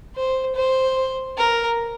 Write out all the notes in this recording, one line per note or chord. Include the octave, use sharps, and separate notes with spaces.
C5
C5
A#4